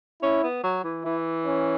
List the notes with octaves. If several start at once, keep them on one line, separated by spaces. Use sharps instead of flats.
C#4 E4
B3
F#3
E3
E3 E4
C#4